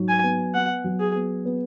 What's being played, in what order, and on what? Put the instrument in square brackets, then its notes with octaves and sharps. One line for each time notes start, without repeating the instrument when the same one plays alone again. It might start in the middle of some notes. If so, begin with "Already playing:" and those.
Already playing: [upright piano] G#2 F#3
[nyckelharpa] G#5
[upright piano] B3
[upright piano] B3 [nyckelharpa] F#5
[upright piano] F#3
[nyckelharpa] G#4
[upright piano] B3
B3